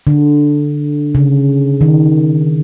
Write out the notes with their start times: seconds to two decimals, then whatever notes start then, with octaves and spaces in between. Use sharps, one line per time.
0.07 D3
1.15 C#3
1.81 D#3